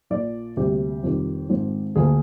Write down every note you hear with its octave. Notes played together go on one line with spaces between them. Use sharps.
A#1 A#2 F3 D5
D2 C3 G3 A#3 G4
F1 F2 D#3 G3
G#1 G#2 F3 C4
D2 D3 F3 A#3 G#4